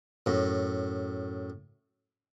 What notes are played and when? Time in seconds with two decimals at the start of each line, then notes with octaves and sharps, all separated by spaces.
0.26 F#2 A2